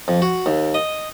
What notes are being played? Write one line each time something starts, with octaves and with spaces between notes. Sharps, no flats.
F2
F#4
D#2
D#5